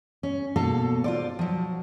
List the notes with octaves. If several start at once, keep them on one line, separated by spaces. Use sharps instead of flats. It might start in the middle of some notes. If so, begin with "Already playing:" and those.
C#4
B2 A#3 A4 F5
F4 C5 D5
F3 F#3